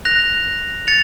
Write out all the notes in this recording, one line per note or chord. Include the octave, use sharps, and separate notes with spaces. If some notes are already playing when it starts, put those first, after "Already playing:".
F#6 A#6 F7
A6 C#7 F7